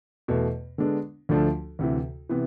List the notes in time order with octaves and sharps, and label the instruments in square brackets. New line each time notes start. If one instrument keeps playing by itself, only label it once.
[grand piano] E2 B2 A3
D3 G#3 B3 D4
D2 D3 F3 A3 D4
D2 C3 E3
C3 E3 B3